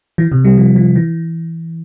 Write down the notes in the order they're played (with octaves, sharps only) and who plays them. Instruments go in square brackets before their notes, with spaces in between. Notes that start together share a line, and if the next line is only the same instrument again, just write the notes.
[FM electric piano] E3
C3
G3
F3
F3
E3